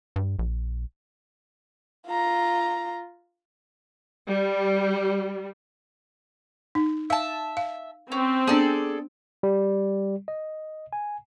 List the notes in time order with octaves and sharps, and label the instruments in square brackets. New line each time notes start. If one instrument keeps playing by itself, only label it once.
[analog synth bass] G2
A#1
[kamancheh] F4 A#5
[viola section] G3
[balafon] D#4
[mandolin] E5 A5 [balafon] F5
[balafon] F5
[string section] C4 [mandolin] C#4
[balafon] B3 D4 [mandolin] G#4 A4 D5
[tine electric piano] G3
D#5
G#5